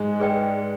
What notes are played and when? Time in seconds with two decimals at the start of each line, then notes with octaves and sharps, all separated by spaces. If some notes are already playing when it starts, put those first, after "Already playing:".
Already playing: G#2 G#3
0.20 G#4 B4 D5 G5